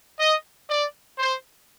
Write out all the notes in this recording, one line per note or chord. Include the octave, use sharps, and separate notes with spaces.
D#5
D5
C5